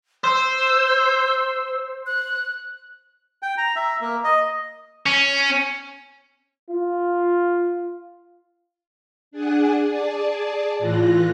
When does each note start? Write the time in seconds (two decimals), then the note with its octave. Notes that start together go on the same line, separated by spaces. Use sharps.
0.24 C5 E6
2.06 F#6
3.43 G5
3.58 A#5
3.76 E5
4.01 A#3
4.24 D#5
5.06 C#4
6.70 F4
9.31 D4 G#4 F#5 G#5
9.84 G#4 D5 A5
10.79 A2 E3 F4 F#6 A#6